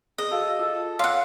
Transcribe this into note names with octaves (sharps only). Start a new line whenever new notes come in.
G#4 D#5
F#4 A4 F5
F4 A4
C#5 F5 F#5 C6 D6